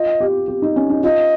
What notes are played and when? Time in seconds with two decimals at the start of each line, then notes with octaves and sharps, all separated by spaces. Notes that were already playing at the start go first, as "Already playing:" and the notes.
Already playing: F4 D#5
0.20 G4
0.48 G4
0.62 D#4
0.76 C#4
0.90 D#4
1.04 F4 D#5